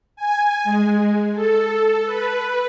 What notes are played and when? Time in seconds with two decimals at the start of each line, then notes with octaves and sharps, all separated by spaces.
0.16 G#5
0.64 G#3
1.34 A4
2.05 B4